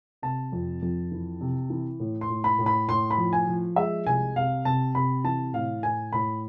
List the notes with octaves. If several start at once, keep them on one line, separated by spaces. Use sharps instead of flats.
C3 A5
F2
F2
E3
C3
E3
A2
C6
A2
B5
A2
B5
A2 C6
B5
F3
G#5
F3
G#3 E5
C2 G#5
C3 F5
C3 A5
C3 B5
E3 A5
A2 F5
A2 G#5
A2 B5